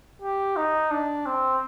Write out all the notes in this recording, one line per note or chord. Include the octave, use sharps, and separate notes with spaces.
G4
D#4
D4
C4